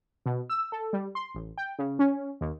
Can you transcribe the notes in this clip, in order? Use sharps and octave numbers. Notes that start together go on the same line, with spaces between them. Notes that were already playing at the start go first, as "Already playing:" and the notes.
B2
E6
A4
G3
C6
A1
G5
C#3
C#4
D#2